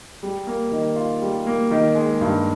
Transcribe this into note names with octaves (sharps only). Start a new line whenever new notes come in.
G3
A#3
D#3
F4
G3
A#3
D#3
G#3
G2